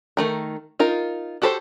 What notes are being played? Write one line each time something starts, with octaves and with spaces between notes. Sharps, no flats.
D#3 A3 A#4
D#4 F4 A#4
F#4 G4 A4 B4 C5